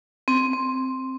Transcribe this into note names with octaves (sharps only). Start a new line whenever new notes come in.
C4
C4